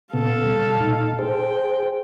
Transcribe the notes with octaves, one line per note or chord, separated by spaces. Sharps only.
A#2 C#3 B3 A4 F5
B2 G3
A#2 D#4
G#4 C5 G5